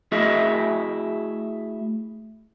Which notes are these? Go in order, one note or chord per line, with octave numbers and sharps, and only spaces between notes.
A3 E4 F#4 G#4 D#5 E5